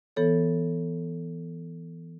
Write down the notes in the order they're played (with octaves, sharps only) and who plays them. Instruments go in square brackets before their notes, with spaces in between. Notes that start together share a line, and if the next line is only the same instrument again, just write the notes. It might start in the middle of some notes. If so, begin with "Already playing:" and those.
[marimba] E3 B3 A4 C#5